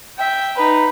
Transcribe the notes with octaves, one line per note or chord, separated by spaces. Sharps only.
E5 G5
D#4 B4